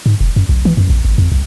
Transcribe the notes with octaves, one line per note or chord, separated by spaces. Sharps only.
G#2
F1
F#2
B1
E3
F#2
A#1
G#1
F2
C2